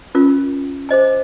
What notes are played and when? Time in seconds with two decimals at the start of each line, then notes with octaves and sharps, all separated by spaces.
0.15 C#4 F4 A#4
0.89 G#4 C5 D#5 G#5